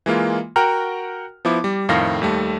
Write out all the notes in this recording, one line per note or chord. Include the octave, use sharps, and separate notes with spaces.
E3 G#3 A#3 F4
F#4 A#4 F#5 G5 A#5 F6
F3 B3 E4 D6
G3
F2 A2 D#3 F5 A#6
D#2 G3 A3